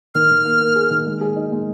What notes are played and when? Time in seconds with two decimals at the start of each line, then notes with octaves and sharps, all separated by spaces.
0.15 D#3 F6
0.31 D#3
0.45 A#3
0.60 A#3
0.76 G#4
0.90 D#3
1.06 G#3
1.21 G#4
1.36 D#4
1.52 G#3